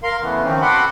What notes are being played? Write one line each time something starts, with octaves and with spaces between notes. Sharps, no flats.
A#4 F5 C6
C#3 E3 A3 B3
D#3 F3 C4 C#4 D#4
F#4 A4 F#5 B5 C6 D6